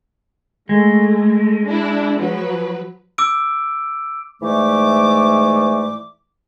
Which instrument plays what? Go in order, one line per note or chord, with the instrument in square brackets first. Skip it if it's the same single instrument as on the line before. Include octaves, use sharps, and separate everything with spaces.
[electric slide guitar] G#3 [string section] A3
[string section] D4 E4
F3 F#3 B4
[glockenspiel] D6 E6 D7
[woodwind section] G#2 E3 A3 D5 D6